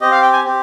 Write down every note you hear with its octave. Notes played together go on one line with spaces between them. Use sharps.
C4 G4 D#5
F5
G5
G#5
C4 G4